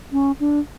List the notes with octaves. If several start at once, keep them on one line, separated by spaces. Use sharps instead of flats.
C#4
D4